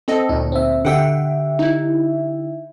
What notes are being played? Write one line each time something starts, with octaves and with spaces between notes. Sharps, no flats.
C4 A4 D#5
D2 A#2 D#4
C4 E5
D3 G4 E5 F#5 G5
D#4 E4